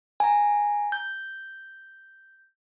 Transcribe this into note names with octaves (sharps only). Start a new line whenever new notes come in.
G#5 A#5
G6